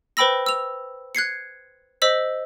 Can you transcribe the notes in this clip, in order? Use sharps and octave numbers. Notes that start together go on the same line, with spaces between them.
B4 C5 G5 B5 E6 A#6
E6 F7
F#6 G#6 C7 C#7
C5 D#5 E6 B6 F#7